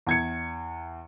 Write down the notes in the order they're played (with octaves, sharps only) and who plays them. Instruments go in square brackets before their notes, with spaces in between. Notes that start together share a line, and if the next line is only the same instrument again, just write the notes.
[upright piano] E2 G#6 C#7